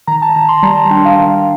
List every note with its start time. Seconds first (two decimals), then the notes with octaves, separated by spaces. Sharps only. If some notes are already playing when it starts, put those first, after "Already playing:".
0.07 D#3 A#5
0.22 A5
0.35 D#3 A#5
0.49 C6
0.63 G3 A#5
0.77 A5
0.91 D4 G5
1.05 F5
1.19 D#3 F5